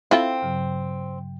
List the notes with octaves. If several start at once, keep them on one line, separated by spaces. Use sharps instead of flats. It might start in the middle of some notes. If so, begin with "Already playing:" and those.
C4 E4 F4 A4
G2 C#3 F#3